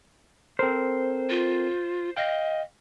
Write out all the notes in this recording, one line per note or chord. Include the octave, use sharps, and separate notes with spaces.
C4 A4 A#4 C5
F4
D#5 F5 G5